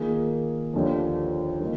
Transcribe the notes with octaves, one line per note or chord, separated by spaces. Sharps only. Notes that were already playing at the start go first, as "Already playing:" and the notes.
Already playing: D#3 A#3 F4 G#4
D#2 D3 F3
D#3 A#3